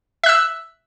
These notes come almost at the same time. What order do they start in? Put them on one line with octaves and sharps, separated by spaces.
E5 F#6 E6